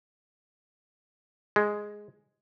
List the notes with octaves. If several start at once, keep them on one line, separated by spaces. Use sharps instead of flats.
G#3